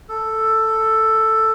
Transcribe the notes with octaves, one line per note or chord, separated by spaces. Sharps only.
A4